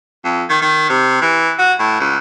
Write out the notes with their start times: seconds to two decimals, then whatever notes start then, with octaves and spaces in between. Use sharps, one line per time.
0.24 F2
0.50 D#3
0.62 D#3
0.90 C3
1.22 E3
1.59 F#4
1.79 A2
2.00 C#2